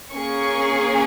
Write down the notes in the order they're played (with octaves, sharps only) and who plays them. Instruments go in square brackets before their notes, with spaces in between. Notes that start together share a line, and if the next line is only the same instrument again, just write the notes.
[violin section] A#3 C#4 G#4 C#6